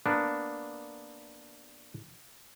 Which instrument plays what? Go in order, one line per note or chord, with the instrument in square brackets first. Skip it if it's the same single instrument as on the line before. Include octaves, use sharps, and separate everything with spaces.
[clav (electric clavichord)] A#3 B3 D4